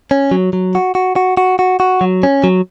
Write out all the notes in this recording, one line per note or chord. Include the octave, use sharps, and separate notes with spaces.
C#4
F#3
F#3
F#4
F#4
F#4
F#4
F#4
F#4
F#3
C#4
F#3